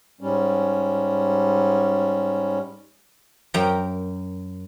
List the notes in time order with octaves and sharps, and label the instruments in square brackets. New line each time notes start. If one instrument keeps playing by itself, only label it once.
[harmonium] G#2 G3 C#4
[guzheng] F#2 A#4 G5 A#5